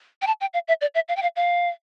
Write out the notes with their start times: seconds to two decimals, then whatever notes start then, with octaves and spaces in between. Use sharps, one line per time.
0.22 G5
0.27 A5
0.41 G5
0.54 F5
0.68 E5
0.81 D5
0.95 E5
1.08 F5
1.16 G5
1.22 F5
1.36 F5